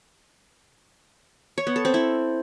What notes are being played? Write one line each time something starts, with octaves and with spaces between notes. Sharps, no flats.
C#5
B3
A4
C4
E4